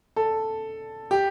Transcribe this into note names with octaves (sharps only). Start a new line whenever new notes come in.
A4
G4